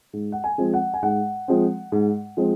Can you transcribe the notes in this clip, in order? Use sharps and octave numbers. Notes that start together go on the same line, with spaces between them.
G#2
F#5
G#5
F3 G#3 C4
F#5
G#5
G#2 F#5
F3 G#3 C4
G#2
F3 G#3 C4